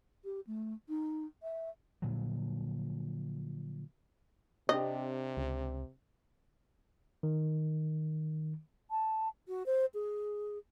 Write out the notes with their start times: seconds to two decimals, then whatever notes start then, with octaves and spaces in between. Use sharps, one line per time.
0.24 G4
0.47 A3
0.89 D#4
1.43 E5
2.02 A#2 D3 F3 F#3
4.69 C3 C4 D4 G4 D#5
5.37 C#2
7.23 D#3
8.91 A5
9.48 F#4
9.66 C5
9.94 G#4